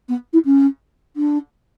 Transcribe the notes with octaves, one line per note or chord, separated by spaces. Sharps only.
B3
E4
C#4
D4